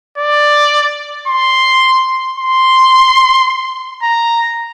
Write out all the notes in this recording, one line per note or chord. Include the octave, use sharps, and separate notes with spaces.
D5
C6
C6
A#5